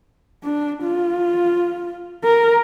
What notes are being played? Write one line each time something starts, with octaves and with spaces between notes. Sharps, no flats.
D4
F4
A#4